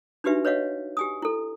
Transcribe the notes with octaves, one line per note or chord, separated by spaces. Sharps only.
D4 D#4 F#4 G4 B4 E5
B4 C#5 D#5 F5 F#5
G4 G#5 D#6
E4 A4